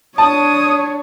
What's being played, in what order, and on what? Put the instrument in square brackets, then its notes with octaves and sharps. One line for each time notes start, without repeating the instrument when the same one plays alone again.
[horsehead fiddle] D4 C#5 [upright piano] A5 [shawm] D#6